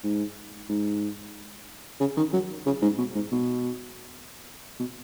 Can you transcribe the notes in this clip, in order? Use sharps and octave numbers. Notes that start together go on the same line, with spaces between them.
G#2
G#2
C#3
D#3
F#3
C#3
G#2
B2
G#2
B2
B2